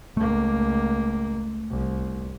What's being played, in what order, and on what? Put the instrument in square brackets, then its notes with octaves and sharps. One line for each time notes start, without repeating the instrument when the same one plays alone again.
[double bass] C#2 A#3 [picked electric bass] A3
[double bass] C2